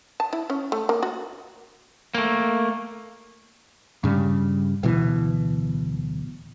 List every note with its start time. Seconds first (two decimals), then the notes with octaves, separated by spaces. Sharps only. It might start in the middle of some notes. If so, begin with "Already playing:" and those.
0.20 A5
0.33 E4
0.50 C#4
0.72 A3
0.89 A#3
1.03 F#4
2.15 A3 A#3
4.04 G2 C#3 G3
4.83 D1 B2 E3